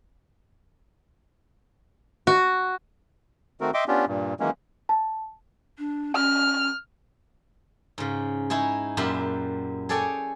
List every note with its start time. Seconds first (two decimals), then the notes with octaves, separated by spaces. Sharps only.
2.27 F#4
3.61 D#3 A3 C4 F#4 A#4
3.74 D#5 E5 G5 C6 D6
3.88 B3 C#4 D4 F4 G4
4.08 G2 A#2
4.40 D#3 E3 F#3 G#3 A#3 C#4
4.89 A5
5.78 D4
6.15 C#4 F6
7.98 G#2 C#3
8.50 D#4 E4 G#4 C#5
8.97 F#2 A#2 G4 E5 B5 C6
9.89 G#4 A4 C#5 D5 G5 G#5